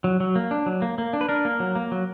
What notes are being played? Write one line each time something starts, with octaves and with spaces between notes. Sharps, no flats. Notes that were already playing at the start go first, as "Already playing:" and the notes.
F#3
F#3
A#3
D4
F#3
A#3
A#3
D4
B4
D4 A#4
A#3
F#3
A#3
F#3